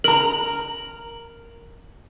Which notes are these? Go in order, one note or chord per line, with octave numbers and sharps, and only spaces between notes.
A#4 A#5 F#7